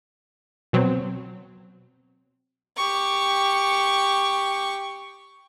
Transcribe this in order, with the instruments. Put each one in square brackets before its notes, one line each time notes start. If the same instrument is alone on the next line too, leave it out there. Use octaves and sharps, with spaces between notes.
[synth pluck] B2 F#3 C4
[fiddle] G4 C#6